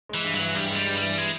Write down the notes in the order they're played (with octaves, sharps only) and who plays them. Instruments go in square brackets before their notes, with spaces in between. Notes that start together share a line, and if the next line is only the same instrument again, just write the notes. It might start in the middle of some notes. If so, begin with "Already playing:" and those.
[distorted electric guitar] E3 [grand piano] G#3
[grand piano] G2
[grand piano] E3 [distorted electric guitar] F#3
[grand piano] G2 [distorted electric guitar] G3
[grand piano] G#3
[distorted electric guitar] G3
[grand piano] G2
[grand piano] E3 [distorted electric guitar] G3
[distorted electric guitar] G#3